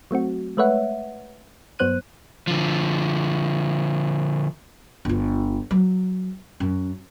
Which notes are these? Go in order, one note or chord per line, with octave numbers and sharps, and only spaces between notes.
F#3 A3 C4 F#4
G#3 A3 B4 C#5 E5 F#5
G2 F#3 B3 C5 F#6 D#7
D3 F3
G1 F4
F#3
F#2